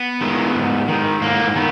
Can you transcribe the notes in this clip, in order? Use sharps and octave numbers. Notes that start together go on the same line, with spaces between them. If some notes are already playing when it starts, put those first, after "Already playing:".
Already playing: B3
D#3 G#3
G#2
D#3 G#3
G#2 A#3
D#3 B3